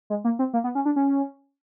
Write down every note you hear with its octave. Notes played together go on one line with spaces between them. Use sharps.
G#3
A#3
C4
A#3
B3
C#4
D4
C#4